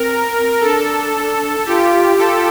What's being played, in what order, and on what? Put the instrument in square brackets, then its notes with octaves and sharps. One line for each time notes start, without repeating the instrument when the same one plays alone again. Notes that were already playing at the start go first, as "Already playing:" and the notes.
Already playing: [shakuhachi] C4 [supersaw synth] A#4
[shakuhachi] D4 [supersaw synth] A4
[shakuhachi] F4 [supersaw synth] G4
[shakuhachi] F4 [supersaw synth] A4